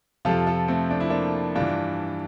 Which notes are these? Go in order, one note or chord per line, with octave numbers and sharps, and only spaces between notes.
F2 C3 F3 F4 A4
F4 A4
A3 C4
D4
E4
A#3 D4
G2 E3 D4 F4